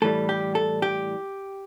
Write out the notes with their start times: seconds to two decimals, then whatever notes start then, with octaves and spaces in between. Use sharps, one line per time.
0.02 A2 E3 G3 A4
0.29 G4
0.55 A4
0.82 G4